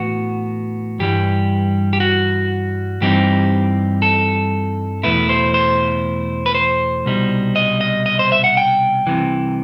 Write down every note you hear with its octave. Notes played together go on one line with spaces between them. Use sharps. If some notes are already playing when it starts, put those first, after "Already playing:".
Already playing: A2 E3 B3 F#4
G2 E3 G3 G4
G4
F#4
G2 E3 G3 C4 D#4 G4
A4
E2 B2 A3 E4 B4
C5
C5
B4
C5
C2 B2 G3 D#4
D#5
D#5
D#5
C5
E5
F#5
G5
C2 C3 E3